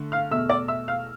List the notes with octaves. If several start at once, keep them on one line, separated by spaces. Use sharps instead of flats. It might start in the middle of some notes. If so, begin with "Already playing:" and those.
Already playing: D3 A3
F5 F6
E2 B2 A3 E5 E6
D5 D6
E5 E6
F5 F6